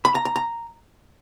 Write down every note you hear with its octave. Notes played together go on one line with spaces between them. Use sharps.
B5
A#5
A#5
A#5